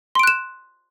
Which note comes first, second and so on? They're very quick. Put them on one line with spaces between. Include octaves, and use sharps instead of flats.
C6 D7 F#6 E7